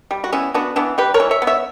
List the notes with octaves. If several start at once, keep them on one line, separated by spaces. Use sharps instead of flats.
G3
F#4
B3 C#4 E4
B3 D4 F#4
E3 B3 D4
G3 G4 B4
A#4 C#5
E3
C#5 E5
B3
C#5 E5